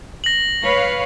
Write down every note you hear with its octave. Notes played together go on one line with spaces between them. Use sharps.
A#6 F#7
B4 C#5 F5